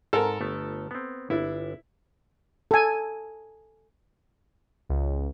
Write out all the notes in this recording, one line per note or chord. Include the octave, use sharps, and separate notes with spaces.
G#2 A4 A#4
G1 A3 B3
B3 C4
G1 D4 E4
A4 G#5
C#2